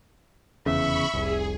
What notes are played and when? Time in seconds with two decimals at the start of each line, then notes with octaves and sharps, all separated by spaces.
0.66 F1 E2 C#3 E5 B5 C#6
1.14 F1 C2 G#4